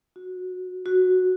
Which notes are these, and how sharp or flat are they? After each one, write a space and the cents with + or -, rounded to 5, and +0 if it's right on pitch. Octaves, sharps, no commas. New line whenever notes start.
F#4 -15
F#4 -5